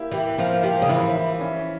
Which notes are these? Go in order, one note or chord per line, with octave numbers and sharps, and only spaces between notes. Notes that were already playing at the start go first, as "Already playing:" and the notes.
Already playing: A#3 E4 G4
E3 G4
F3 A#3
F3 G4
C#3
E3 E4
E4
C#4